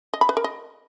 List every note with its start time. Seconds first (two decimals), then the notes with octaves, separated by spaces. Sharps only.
0.14 D#5
0.21 B5
0.29 B4
0.37 A#4
0.44 D#5